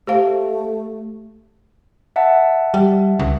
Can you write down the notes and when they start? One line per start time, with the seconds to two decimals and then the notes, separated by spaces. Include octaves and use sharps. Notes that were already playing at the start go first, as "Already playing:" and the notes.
0.07 A3 G4 C5 F5
2.16 E5 F#5 A5
2.74 G3
3.19 C#2